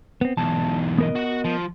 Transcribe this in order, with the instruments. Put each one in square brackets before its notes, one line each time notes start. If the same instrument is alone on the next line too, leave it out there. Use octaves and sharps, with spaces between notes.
[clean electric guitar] B3 C4
[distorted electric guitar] B1 E2 [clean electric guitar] A5
[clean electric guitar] B3 A#4 D#5
[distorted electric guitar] F#4 F#5
F3